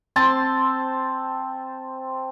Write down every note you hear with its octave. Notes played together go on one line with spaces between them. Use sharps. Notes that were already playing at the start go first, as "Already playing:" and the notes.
C4 C5 A5 C6